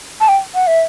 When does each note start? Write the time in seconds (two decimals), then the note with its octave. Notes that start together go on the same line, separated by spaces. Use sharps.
0.21 A5
0.28 G5
0.55 F#5
0.67 E5